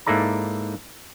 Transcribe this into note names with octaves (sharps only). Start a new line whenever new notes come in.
G#2 A#3 E4 A4 D5 A#5